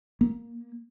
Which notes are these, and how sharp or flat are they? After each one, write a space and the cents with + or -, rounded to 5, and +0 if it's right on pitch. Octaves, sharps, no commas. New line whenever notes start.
A#3 +10